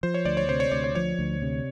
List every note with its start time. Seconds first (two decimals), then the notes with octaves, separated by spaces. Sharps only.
0.03 F3 C5
0.14 C#5
0.25 D2 D5
0.37 C#5
0.49 C3 C5
0.60 C#5
0.72 D2 D5
0.84 C#5
0.95 F3 C#5
1.19 D2
1.42 C3